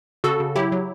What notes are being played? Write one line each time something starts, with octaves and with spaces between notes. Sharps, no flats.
C#3 F#4 A4
C#3
F#3 E4 G4
F#3